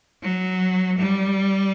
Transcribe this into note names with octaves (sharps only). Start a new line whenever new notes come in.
F#3
G3